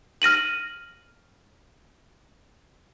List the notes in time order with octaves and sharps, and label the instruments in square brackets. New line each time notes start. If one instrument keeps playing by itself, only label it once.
[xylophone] F6 A#6 D#7 F#7